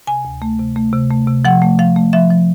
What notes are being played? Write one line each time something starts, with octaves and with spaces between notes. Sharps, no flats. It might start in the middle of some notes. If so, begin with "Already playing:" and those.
C3 G#5
D2
A3
C3
A3
C3
A3
C3
F3 F#5
A3
F3 F5
A3
F3 E5
F3